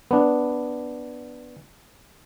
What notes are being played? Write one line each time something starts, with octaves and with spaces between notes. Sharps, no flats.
B3 D4